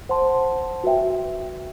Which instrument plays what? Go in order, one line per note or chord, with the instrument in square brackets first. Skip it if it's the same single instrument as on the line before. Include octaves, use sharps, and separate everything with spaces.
[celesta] C5 F#5 A5 C6
F#4 B4 E5 G5